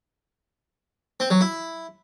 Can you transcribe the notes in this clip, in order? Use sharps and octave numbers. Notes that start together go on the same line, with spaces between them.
C4
F#3
E4